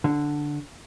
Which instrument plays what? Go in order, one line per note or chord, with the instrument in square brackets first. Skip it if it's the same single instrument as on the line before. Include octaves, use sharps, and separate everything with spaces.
[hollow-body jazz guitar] D3